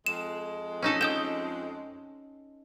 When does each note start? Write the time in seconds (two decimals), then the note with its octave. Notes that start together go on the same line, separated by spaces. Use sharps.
0.06 F2 G#3 E7
0.82 C#4 D#4 A4
1.01 G5 D#6 G6 E7